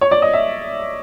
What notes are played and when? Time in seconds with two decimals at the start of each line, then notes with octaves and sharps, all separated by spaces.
0.01 C#5
0.11 D5
0.22 D#5
0.33 E5